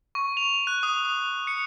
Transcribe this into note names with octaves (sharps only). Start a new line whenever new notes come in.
C#6
F7
F#6
D#6
D#6
C#7